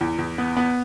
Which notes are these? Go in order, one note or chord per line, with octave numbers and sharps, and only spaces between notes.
E2
E2
B3
B3